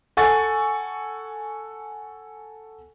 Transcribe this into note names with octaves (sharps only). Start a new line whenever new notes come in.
A4 F#5 G#5 C#6 A6